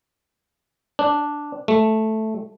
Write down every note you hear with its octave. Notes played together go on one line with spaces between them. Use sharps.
D4
A3